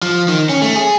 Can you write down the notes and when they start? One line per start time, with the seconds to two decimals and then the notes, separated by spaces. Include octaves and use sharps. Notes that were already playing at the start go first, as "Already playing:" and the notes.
0.02 F3
0.28 D#3
0.49 C#4
0.62 A3
0.76 G#4